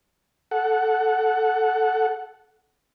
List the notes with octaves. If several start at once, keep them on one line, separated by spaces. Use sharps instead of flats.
A4 F#5